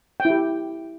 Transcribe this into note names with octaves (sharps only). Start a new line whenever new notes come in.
G5
E4
G4